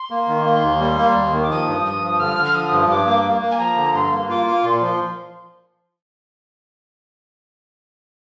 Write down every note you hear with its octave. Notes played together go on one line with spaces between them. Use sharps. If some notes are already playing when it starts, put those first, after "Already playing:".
Already playing: C6
A#3
D#3
A#3
D#2
G3
A#3
D#2
D#3
D6
F3 D#6
G2
G2 D#6
F3
D3 F6
D3
F6
F3 D#6
G2
G2 D6
A#3
A#3
A#3
G#5
F3 A#5
D3
G2 C6
A#3
F4 D6
F4
A#2 C6
F3